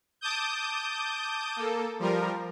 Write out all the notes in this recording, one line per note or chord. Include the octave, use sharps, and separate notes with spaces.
A5 D6 D#6 G6
A#3 A4
F3 G3 F4 A#4